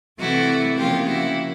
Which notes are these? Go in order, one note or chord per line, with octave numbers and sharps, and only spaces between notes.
C3 E3 A3 E4 F#4
C#3 F3 A#3 F4 G4
E4 F#4